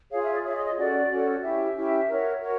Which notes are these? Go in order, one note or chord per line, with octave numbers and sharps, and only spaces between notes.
F4 G#4 C#5 F5
E5
D5
F4 G#4 C#5 E5
D#5
D#5
C#4 F#4 A4 D5
C#4 F#4 A4
C#4 E4 G4 E5
C#4 E4 G4
F#4 A#4 C#5
F#4 A#4 C#5